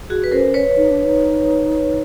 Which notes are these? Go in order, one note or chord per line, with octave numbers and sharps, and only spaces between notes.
F#4 G#4
B4
C#4 A#4 C5
B4 C#5
D#4
D4
D#4